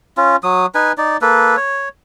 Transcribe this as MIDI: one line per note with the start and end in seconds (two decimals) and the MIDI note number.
0.17 0.36 61
0.17 0.36 65
0.43 0.66 54
0.43 0.66 87
0.75 0.92 63
0.75 0.92 71
0.75 0.92 80
0.98 1.17 63
0.98 1.17 74
1.22 1.56 58
1.22 1.56 69
1.22 1.56 71
1.57 1.89 73